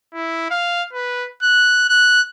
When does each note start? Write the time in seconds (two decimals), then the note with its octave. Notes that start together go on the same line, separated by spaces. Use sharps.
0.14 E4
0.50 F5
0.93 B4
1.43 F#6
1.89 F#6